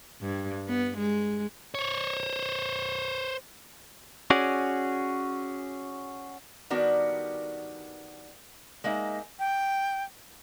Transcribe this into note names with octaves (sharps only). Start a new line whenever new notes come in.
G2
B3
G#3
C5 C#5
C#4 F#4 G#4 D5
D#3 G3 B3 D4 F#4 A#4
G#3 A#3 D#4 E5
G5